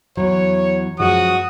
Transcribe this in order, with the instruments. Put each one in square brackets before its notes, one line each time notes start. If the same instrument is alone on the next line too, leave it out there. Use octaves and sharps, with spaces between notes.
[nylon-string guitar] E2 F#3 [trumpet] C#5
[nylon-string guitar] F#2 F3 G#3 [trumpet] F#4 [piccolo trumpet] D#6